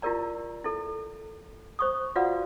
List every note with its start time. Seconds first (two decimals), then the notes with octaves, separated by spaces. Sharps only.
0.02 E4 F4 G4 A#4 D5 A#5
0.64 E4 A4
1.79 C5 C#6 D#6
2.16 F4 F#4 B4 D5 F5 F#5